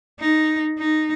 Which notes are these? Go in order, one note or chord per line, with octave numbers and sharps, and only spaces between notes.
D#4
D#4